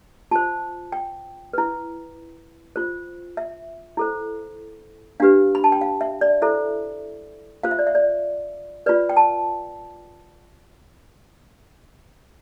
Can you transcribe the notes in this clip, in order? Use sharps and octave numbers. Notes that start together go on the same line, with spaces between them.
F4 C5 A5
G5
E4 B4
F4 C5
E5
E4 A4 C5
D4 G4 B4 F5
B5
A5
G5
F5
E5
D5
E4 A4 C5 E5
F4 C5 F5
E5
D5
E5
D5
F4 B4 D5
G5
A5